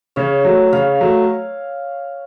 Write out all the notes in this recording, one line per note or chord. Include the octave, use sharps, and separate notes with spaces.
C#3 C#5
F#3 A3
C#3 F5
F#3 A3